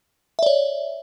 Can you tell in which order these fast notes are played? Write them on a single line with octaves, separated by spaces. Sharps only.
E5 D5 C#5